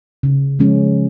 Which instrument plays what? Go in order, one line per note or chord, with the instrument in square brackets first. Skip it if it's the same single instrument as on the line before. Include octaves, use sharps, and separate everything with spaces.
[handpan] C#3
F3 G#3 C#4